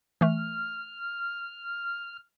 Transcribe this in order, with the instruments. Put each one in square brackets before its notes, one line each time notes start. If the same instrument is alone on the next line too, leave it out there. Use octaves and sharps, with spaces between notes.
[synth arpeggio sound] E3 A3 [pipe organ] F6